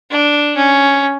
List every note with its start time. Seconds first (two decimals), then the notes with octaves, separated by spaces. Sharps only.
0.11 D4
0.56 C#4